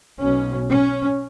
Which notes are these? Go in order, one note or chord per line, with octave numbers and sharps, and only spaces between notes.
B1 B2 C#4
C#4